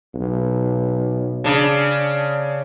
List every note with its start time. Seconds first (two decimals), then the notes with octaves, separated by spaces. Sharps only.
0.15 B1
1.44 C#3 D4